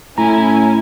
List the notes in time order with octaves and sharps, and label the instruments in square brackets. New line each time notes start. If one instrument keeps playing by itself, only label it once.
[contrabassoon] A2 [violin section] C#4 E4 G#5 [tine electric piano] A#5